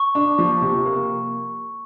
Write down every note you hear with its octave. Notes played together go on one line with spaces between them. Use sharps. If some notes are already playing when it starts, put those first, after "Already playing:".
Already playing: C#6
D4
F3
C3
A#3